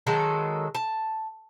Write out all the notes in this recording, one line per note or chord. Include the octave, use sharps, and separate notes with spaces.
D#3 F#3 G#3 A4
A5